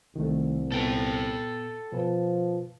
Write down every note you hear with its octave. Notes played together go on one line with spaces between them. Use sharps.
C2 D#3 A3
A#2 B3 A4 G5
B2 F3 B4 A5